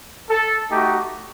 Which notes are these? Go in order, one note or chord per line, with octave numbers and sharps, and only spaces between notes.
A4
A3 D#4 F#4 G4